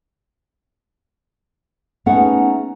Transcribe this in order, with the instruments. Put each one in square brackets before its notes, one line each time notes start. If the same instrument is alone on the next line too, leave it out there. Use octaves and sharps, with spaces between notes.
[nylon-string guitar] A3 B3 C#4 D#4 G#4 F#5